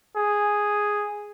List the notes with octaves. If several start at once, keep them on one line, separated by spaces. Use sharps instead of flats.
G#4